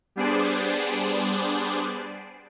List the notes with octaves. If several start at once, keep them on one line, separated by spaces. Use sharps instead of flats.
G3 B3 D4 G#4 C5 D5